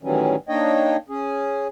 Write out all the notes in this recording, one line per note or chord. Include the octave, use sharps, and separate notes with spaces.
A2 D#3 E3 F#3 G3 C#4
A#3 D4 D#4 C#5 D#5 G5
C#4 G#4